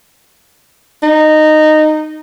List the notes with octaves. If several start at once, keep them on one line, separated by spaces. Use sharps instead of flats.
D#4